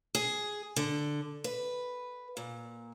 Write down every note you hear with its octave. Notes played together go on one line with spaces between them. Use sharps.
G#4
D3
B4
A#2